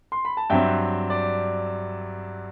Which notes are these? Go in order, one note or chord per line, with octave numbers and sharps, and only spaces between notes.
C6
B5
A5
G2 F#3 C4 E5 G5
D5